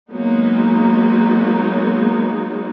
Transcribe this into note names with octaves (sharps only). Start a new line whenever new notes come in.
F#3 G#3 A#3 B3 D#4